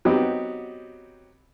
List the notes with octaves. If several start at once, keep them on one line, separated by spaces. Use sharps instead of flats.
F#3 B3 C4 D#4 G4